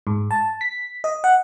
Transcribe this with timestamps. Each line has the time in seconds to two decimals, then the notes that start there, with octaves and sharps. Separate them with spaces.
0.07 G#2
0.31 A5
0.61 B6
1.04 D#5
1.24 F#5